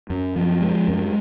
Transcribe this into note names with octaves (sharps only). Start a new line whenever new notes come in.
F#2
F3
G#3
F#2